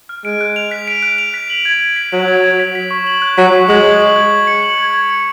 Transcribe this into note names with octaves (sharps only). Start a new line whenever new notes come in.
F6
G#3 D7
F#6
F7
B6
D7
F#6
F7
B6
F#7
G#6
G#6
B6
F#3 F#7
G#6
G#6
B6
B6
C#6
F#7
F#6
F#3 B6
C#6
G#3 F#7
F#6
F#7
G#6
G#6
C#7
F#7
G#6
G#6
C#7